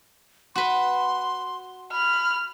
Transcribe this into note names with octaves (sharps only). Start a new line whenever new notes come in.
F#4 B4 C6
B5 F6